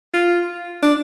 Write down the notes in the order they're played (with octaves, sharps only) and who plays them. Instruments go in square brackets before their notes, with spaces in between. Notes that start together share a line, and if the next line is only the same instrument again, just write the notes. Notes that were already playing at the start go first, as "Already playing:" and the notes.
[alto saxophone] F4
D4